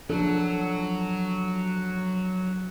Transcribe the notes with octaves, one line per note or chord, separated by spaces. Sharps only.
F3 F#3 D4 A4